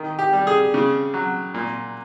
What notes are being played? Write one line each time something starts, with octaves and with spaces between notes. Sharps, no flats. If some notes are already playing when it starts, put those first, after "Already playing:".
Already playing: D#3
G4
G3
G#4
C#3
F#3
A#2